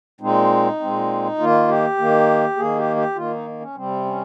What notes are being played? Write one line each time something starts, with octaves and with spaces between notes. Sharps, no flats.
A#2 G#3 C4 D#4
A#2 G#3 C4
D#3 A#3 F4
G4
D#3 A#3
D#3 A#3 G#4
G4
G4
D#3 A#3 F4
D#4
C#4
C3 G3 C4
C#4